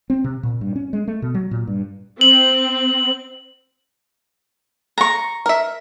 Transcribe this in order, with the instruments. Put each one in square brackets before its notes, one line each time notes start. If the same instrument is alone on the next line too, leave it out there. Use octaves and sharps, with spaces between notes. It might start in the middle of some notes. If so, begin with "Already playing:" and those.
[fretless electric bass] C4
C3
A#2
G2
C#4
G#3
A3
B2
F#3
A#2
G2
[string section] C4 [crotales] F#7
[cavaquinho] A#5 C#6
[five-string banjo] A#4 E5